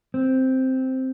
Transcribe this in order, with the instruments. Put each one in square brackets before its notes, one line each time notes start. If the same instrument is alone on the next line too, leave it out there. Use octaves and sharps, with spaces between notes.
[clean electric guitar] C4